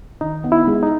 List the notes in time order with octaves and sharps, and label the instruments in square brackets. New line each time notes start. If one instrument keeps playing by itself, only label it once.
[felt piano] D#3 [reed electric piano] D#4
[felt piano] B3
[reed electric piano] E4
[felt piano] G#3
[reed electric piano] D#4